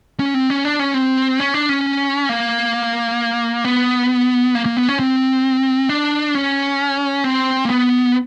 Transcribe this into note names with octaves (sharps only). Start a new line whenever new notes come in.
C#4
C4
C#4
D4
C#4
C4
C#4
D4
C#4
A#3
B3
A#3
A#3
B3
C#4
C4
D4
C#4
C4
A#3
B3